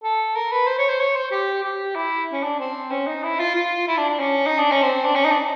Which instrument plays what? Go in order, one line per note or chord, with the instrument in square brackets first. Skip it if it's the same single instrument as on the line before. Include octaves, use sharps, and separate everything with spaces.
[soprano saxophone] A4
A#4
B4
C5
C#5
C5
C#5
C5
G4
G4
E4
C#4
D4
C4
C#4
D#4
E4
F4
F4
E4
D4
D4
C#4
D#4
D4
C#4
C4
D4
C#4
D#4
D4